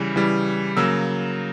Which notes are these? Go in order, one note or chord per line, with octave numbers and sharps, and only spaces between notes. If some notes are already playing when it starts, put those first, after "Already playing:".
Already playing: C#3 E3 G3
C#3 E3 G3
C#3 F#3 A#3 E6